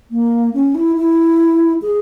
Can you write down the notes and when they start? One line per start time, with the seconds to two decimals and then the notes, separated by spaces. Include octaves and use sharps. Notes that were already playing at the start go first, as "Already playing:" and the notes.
0.11 A#3
0.54 C#4
0.75 E4
0.96 E4
1.82 G#4